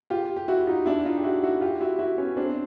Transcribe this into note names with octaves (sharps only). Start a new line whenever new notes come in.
F4 G4
G4
E4 F#4
D#4 F4
D4 E4
D#4 F4
G4
E4 F#4
E4 F#4
F4 G4
E4 F#4
E4 F#4
B3 C#4
C4 D4